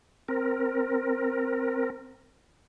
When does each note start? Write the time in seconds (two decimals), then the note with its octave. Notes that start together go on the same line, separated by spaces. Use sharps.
0.28 C4 A#4